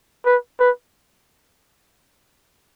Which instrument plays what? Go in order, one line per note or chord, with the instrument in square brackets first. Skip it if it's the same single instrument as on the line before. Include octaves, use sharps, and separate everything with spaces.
[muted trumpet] B4
B4